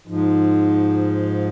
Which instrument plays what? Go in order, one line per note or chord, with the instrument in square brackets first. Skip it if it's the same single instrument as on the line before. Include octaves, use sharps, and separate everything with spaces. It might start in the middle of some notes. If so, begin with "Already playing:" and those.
[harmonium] G#2 F3